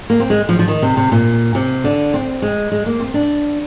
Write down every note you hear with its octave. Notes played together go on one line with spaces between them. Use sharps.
A#3
C4
G#3
F3
F3
D#3
C3
C3
A#2
C3
D3
C4
G#3
G#3
A#3
C4
D4